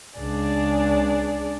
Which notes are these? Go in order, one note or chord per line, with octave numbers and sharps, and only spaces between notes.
C#2 D4 G#4 D5